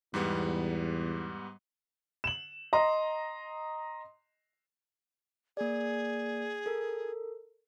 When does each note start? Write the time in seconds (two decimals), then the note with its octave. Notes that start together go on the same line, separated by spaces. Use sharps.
0.14 E2 G#2 G3 B3
2.24 E7 F#7
2.73 D#5 A#5 C6
5.57 A#3 G#4 D5
6.66 A4 A#4